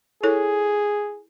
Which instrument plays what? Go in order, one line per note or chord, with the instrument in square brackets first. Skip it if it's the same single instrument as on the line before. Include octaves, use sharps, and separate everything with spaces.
[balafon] E4 A4 C#5 [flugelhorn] G#4